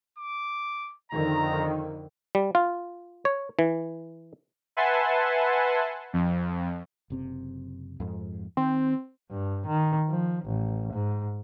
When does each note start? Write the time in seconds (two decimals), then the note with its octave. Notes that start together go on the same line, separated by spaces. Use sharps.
0.18 D6
1.12 F2 D3 D#3 A#5
2.35 G3
2.55 F4
3.25 C#5
3.59 E3
4.77 B4 E5 F#5 G#5 A5 C6
6.13 F2
7.10 F#1 C3 C4
8.00 F2 G#2
8.57 D#3 C4
9.32 G2
9.67 D#3
10.09 F3
10.46 A1
10.93 G#2